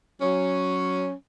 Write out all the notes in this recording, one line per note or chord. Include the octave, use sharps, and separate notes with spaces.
F#3 C#4